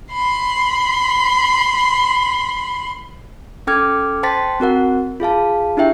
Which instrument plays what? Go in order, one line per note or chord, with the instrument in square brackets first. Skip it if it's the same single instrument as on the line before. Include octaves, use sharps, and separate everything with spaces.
[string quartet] B5 C6
[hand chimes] C#4 A4 G5 D6 F6 G#6
C5 G5 A5 C6 A6 B6
C4 F#4 A#4 F#5
F4 G#4 F5 A5
D4 E4 G4 E5 G5